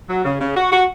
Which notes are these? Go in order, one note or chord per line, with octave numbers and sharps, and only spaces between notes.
F#3
C#3
C#3
F#4
F#4